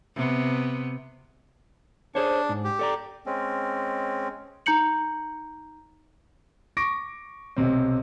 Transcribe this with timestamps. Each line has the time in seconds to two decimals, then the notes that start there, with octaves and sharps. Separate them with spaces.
0.16 C3 B3
2.15 D4 G#4 C5 C#5
2.49 G#2
2.64 G4
2.79 A4 D5 A#5
3.26 G#3 C4 C#4
4.66 D#4 A#5 G6 C#7 F#7
6.77 C#6 D6 A#6 D7
7.56 B1 C3 C4